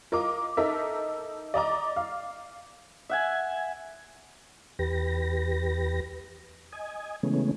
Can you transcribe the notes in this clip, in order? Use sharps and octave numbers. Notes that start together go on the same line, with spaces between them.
F4 A#4 D#5 D6
D#4 A4 A#4 E5
D5 D#5 A#5 D6
F5
E5 F#5 G#5
E2 G4 B4 A#6
D#5 G#5
C#3 E3 G#3 A3 B3 C#4